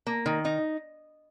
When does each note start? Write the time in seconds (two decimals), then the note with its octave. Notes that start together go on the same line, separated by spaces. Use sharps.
0.07 A#3
0.26 D#3
0.45 D#4